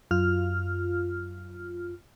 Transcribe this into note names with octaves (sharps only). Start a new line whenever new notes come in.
F#2 F4 F6